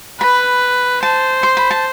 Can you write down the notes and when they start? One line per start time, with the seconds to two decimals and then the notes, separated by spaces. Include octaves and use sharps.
0.21 B4 B5
1.03 C5 A5
1.43 C6
1.57 B5
1.71 A5